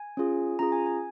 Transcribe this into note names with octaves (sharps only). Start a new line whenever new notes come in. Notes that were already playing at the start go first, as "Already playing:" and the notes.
Already playing: G#5
C#4 F4 G#4
C#4 F4 G#4 A#5
G#5
G#5